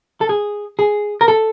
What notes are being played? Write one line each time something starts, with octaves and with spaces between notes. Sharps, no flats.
A4
G#4
G#4
A#4
A4